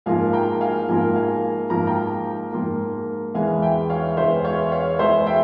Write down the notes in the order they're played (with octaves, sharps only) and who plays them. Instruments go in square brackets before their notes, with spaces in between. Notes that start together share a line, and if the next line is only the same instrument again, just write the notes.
[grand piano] G#2 F3 A#3 F4 A#4 [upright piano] F5 G#5
[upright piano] G5 A#5
F5 G#5
[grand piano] G#2 F3 A#3 F4 A#4 [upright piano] F5 G#5
[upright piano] F5 G#5
[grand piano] G#2 F3 A#3 F4 A#4 [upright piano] A#5
[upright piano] G5 A#5
[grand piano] G#2 F3 A#3 F4 A#4
[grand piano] E2 E3 G#3 [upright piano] F5 G#5
[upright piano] E5 G5
C#5 F5
[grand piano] E2 E3 G#3 [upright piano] C5 E5
[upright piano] C#5 F5
C#5 F5
[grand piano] E2 E3 G#3 [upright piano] C5 E5
[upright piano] E5 G5